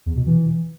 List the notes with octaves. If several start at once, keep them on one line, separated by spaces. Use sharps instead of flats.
E2
B2
E3